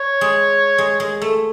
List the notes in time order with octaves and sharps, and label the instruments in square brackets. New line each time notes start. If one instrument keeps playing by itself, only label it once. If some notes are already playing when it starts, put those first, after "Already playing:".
Already playing: [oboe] C#5
[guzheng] G#3
G#3
G#3
A3